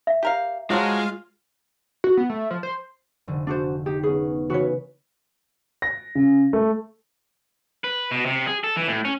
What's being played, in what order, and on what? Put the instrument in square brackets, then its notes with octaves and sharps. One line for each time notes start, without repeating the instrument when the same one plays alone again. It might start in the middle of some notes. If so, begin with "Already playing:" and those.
[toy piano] E5
[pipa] G4 A#4 F5
[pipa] F3 F#3 F#4 [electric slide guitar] G#3 [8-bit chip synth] F4 F5 F6
[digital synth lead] F#4
B3
A3
F3
C5
[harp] F1 D3
[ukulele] D4 F#4 C5
[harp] D#4 [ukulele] G4
[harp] B3 C#4 [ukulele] G#4
[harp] C#3 E3 B4 [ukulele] F#4 C#5
[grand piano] A#6
C#3
A3
[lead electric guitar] B4
B2
C3
G#4
A4
E3
A2
C#4